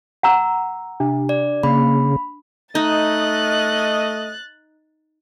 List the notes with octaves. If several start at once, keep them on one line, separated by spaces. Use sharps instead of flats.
F#5 A#5 E6
C3 D4
D5
C#3 A#3 B5
A3 D#4 D#5 F#6 A6